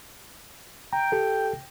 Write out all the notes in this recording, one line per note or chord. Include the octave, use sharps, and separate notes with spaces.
G5 A#5
G4 A4